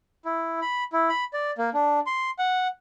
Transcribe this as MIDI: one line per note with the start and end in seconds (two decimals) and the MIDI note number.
0.25 0.60 64
0.62 0.84 83
0.93 1.09 64
1.09 1.24 83
1.33 1.51 74
1.58 1.70 58
1.74 2.00 62
2.06 2.30 84
2.39 2.68 78